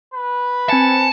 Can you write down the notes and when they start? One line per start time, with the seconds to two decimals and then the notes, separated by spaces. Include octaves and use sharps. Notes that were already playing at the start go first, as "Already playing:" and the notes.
0.14 B4
0.69 C4 G#5 A5 C#7